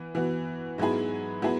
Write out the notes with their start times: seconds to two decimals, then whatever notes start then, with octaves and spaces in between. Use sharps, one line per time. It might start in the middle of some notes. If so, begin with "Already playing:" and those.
Already playing: E3 B3
0.15 E3 B3 F#4
0.78 G#2 F#3 B3 E4 G#4
1.42 F#3 B3 E4 G#4